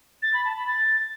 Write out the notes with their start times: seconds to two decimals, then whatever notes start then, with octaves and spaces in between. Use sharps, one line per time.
0.22 A6
0.34 B5
0.45 A5
0.56 B5
0.68 A6